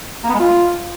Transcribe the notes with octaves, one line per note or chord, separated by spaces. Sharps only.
A#3
B3
G#3
F4